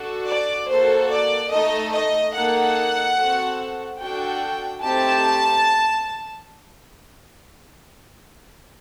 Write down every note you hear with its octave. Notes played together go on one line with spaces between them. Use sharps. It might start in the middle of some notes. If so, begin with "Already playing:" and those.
Already playing: D4 F#4 A4
D5
A#3 F#4 A4 C5
D5
A3 D#4 A4 D#5
D#5
A#3 D#4 A4 F#5
C4 F#4 A4
D4 F#4 A4 G5
A3 C4 D#4 G4 A5